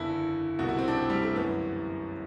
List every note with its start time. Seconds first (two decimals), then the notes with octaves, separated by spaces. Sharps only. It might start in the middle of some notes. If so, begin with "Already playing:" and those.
Already playing: F#1 E2 D3 E4
0.59 C2 B2 F#4
0.69 E4
0.79 C4
0.88 D4
0.97 C4
1.10 G3
1.23 A3
1.36 G1 F#2 E3 B3